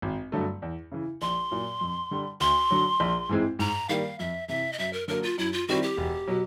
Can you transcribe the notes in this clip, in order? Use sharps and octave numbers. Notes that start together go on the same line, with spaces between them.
G#1
G2 D3 F#3 A3
E2
C#3 E3
A#1 C6
A#2 F#3
F2
D3 G3
D2 C6
D3 F#3
A#1
G#2 E3 G#3 C4
G#2 A#5
D#3 G3 A#3 F5
F2 E5
C3 E3 E5
D#5
F#2 E5
A#4
D3 F#3 A#3 A#4
F4
F#2 E4
F4
D#3 G3 C4 E4 F#4
G4
E1
B2 F#3